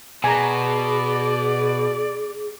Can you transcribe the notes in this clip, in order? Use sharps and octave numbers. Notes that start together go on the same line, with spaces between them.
B2 G#4 D5 G#5 A#5